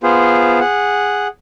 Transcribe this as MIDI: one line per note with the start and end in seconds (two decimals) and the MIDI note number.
0.03 0.60 59
0.03 0.60 65
0.03 0.60 68
0.03 0.60 72
0.60 1.27 68
0.60 1.27 78